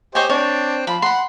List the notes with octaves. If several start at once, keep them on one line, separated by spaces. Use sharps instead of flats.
G4 C5 C#5 D#5 G5 G#5
C4 D4 C#5
F3 B5
F#5 B5 C6